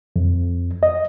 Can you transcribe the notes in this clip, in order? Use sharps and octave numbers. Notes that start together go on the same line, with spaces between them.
F2
D#5